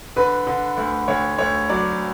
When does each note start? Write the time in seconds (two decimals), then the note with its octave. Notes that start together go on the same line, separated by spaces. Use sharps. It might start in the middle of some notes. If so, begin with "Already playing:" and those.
0.16 D3 B4
0.47 D3
0.77 D2
1.08 D2 C#5
1.38 D2 C#5
1.69 F#3 D5